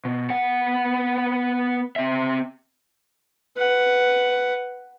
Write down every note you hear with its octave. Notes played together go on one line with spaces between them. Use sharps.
B2
B3 F#5
C4 E5
B4 F#5